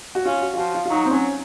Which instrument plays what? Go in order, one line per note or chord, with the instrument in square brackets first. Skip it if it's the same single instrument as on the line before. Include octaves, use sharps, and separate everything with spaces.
[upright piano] F#4
[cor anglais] C#4 [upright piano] F4
[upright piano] F#4
F4
[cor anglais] F3 [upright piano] F#4
[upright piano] F4
F4
[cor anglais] F#3 [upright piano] D#4
[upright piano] C4
[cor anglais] F#3 [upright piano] C#4